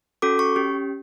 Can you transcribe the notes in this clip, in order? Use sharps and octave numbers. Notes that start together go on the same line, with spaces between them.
C#4 F#4 A4 D6
C#6
C#4 G4